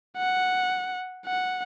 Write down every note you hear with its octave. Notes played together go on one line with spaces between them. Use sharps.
F#5
F#5